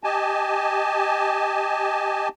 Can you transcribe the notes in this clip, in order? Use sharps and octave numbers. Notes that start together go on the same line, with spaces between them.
G4 D#5 G#5 A5